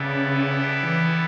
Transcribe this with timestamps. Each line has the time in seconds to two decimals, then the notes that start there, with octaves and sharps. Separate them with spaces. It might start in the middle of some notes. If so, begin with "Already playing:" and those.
Already playing: C#3 G3 B3 E4 A4 D5
0.82 E3